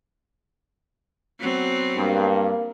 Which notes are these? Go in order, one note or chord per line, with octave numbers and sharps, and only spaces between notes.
F#3 B3 C4
G2 A#3